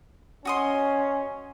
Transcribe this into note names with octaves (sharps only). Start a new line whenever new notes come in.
C#4 F#4 D#5 C6